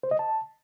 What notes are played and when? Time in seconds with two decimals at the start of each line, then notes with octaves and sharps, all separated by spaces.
0.03 C5
0.11 D#5
0.19 A5